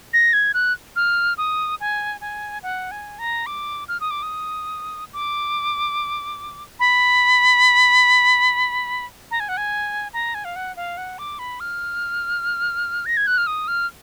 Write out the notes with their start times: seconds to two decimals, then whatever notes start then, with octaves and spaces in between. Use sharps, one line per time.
0.14 A#6
0.33 G#6
0.54 F#6
0.96 F6
1.38 D#6
1.80 G#5
2.21 G#5
2.63 F#5
2.91 G#5
3.19 A#5
3.46 D6
3.88 F6
4.00 D#6
4.11 D6
4.23 D#6
5.13 D6
6.80 B5
9.31 A#5
9.40 G#5
9.49 F#5
9.57 G#5
10.13 A#5
10.34 G#5
10.45 F5
10.56 F#5
10.76 F5
10.97 F#5
11.19 D6
11.39 B5
11.60 F6
13.06 A#6
13.17 G#6
13.27 F#6
13.38 F6
13.47 D#6
13.68 F6